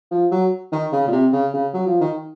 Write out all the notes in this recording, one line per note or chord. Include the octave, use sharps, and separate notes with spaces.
F3
F#3
D#3
C#3
A#2
C3
C#3
C#3
F#3
F3
D#3